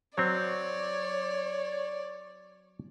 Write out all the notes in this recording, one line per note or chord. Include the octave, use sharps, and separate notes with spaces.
F#3 C4 C#5 D5